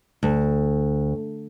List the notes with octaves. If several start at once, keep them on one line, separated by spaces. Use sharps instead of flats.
D2